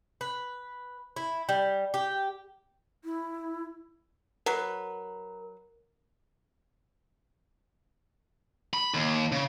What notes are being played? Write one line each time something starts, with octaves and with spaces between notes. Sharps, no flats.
B4
E4
G3
G4
E4
F#3 A#4 B4
B5
D#2
C#3